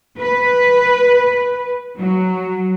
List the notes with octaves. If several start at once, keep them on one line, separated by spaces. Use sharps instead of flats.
B4
F#3